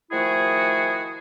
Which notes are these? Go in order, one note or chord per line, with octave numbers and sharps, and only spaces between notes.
D#3 F3 A3 E4 F#4 G#4